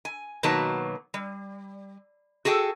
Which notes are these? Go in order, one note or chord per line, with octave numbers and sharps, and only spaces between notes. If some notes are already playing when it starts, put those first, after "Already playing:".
G#5
B2 D#3 F#3 A#3 B4 A5
G3
F#4 G#4 A4 F#5 G5